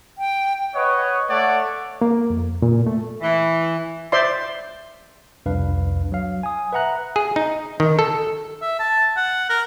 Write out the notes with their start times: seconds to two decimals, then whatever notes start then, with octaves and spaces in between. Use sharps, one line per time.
0.18 G5
0.75 B4 C#5 D#5 F#5 C#6
1.29 A3 C#5 D5 F#5
2.02 A#3
2.30 F2
2.62 A#2
2.87 A3
3.21 E3
4.12 C5 D5 E5 C6
5.46 C2 F2 D4 B4 F5
6.12 F#3 F5
6.43 G#5 D#6
6.73 B4 E5 F#5 A#5 F#6
7.16 G#4
7.36 D#4
7.80 D#3
7.99 A4
8.62 E5
8.79 A5
9.17 F#5
9.50 A#4